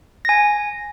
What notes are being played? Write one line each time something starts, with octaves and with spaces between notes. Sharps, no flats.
G#5 A#6